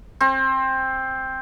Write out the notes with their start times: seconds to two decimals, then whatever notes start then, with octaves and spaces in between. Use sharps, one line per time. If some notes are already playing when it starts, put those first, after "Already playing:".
0.21 C4